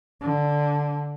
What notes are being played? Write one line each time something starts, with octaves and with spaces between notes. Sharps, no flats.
D3